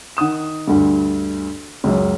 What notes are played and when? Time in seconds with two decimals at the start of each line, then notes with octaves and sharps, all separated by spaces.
0.17 D#3 F#5 D#6 E7
0.68 D2 G2
1.84 C#2 F#2